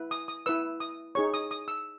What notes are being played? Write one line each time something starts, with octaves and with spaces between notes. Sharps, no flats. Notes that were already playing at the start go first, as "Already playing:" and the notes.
Already playing: E4 B4
D#6
D#6
E4 B4 E6
D#6
D#4 G#4 C#5 C#6
D#6
D#6
E6